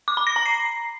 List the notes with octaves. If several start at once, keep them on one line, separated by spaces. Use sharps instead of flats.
D6
B5
A#6
A#5
C7